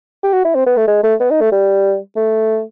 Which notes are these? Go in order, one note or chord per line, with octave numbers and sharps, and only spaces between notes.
G4
F#4
E4
C4
B3
A3
G#3
A3
B3
D#4
A3
G3
A3